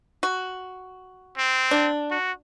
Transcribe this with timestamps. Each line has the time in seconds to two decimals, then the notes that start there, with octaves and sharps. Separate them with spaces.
0.23 F#4
1.38 C4
1.71 D4
2.11 F#4